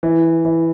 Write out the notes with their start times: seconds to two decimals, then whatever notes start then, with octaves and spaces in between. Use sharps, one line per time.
0.03 E3
0.45 E3